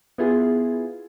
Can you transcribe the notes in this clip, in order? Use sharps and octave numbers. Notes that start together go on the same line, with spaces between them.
B3 E4 F4 G#4